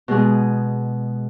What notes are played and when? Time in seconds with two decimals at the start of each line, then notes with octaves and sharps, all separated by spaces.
0.08 B2 G#3 G#4